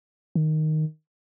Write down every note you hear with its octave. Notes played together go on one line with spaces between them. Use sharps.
D#3